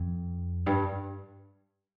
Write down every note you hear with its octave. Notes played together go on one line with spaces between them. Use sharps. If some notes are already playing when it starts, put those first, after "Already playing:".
Already playing: F2
G2